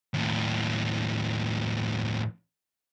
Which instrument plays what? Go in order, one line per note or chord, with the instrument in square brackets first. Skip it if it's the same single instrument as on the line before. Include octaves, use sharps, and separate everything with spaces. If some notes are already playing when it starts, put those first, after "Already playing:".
[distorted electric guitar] D#2 A2